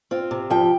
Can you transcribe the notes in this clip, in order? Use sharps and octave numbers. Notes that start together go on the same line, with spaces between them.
C4 F4
C3
F3 G5